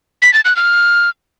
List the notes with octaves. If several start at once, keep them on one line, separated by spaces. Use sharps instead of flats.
B6
A6
F#6
F6